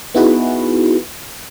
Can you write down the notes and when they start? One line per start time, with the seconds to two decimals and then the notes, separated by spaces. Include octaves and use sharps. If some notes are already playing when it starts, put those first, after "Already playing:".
0.15 B3 D#4 E4 F#4 G#4 B4